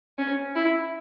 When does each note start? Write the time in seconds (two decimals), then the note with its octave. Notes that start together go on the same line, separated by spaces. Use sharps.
0.18 C#4
0.55 E4